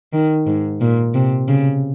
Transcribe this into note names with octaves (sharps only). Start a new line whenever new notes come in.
D#3
G#2
A#2
C3
C#3